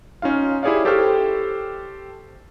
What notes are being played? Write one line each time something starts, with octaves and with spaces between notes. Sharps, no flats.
C#4 D#4 F4 F5
E4 G4 G#4 C#5 D5 F5
G4 A4 C5 G5 C#6 F6